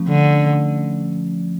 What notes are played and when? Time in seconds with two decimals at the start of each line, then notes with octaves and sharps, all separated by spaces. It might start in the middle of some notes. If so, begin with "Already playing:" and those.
Already playing: F3 A3 C#4
0.08 D3